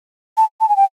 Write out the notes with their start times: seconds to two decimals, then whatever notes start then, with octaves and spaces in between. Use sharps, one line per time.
0.37 A5
0.61 A5
0.69 G#5
0.76 G5